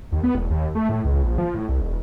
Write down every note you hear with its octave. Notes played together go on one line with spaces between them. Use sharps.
D#2
B3
E1
D#2
A3
A2
C#2
A#1
F3
A2
C2
E1